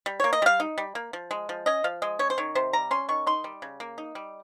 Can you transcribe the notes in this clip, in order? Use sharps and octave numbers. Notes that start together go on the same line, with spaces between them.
G3
A#3 C#5
D#5
G3 F5
D#4
G3
A#3
F3
G#3
F3
C#4 D#5
F3 F5
G#3 D#5
C#4 C#5
C5
D#3 C#5
C3 C5
G3 A#5
C#4 C6
D#3 C#6
D#4 C6
G3
C#3
A#3
D#4
G3